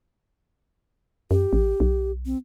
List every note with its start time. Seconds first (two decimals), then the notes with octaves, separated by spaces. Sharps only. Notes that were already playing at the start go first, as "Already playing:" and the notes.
1.31 F#2 G4
1.53 A1
1.80 B1
2.26 C4